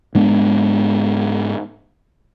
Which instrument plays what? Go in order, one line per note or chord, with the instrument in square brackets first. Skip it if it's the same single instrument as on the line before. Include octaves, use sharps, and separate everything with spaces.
[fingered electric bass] G#2 G#3 B3 D4